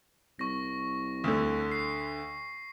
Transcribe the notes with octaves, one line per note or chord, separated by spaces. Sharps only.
C2 C#6 A#6
D2 D3
C7